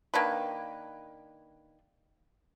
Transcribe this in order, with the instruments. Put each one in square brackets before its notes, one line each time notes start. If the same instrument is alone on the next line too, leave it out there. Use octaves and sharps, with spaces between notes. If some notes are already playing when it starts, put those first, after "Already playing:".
[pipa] D#3 A#3 D4 B4